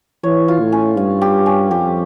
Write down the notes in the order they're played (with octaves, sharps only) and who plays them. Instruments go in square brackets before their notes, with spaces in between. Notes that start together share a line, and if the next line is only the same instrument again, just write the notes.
[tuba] E3 [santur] C#5
[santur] F4
[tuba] A2
[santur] C#4
[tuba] G2 [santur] F5
[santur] G4
C#4
[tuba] F2 [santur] G4